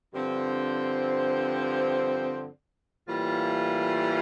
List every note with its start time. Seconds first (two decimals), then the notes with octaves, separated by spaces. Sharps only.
0.13 G2 D3 F3 C4
3.07 A2 E3 G3 A#3 F4